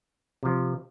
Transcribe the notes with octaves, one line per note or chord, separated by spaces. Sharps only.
C3 F3